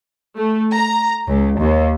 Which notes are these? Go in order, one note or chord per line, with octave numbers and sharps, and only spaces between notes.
A3
A#5
C#2
D#2